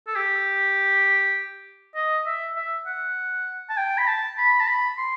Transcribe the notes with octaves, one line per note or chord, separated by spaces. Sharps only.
A4
G4
D#5
E5
E5
F#5
A5
G5
B5
A5
B5
A5
B5
C6